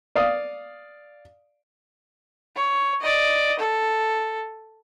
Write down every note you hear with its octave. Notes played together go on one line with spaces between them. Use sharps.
D5 F5 D#6
C#5
D5 D#5
A4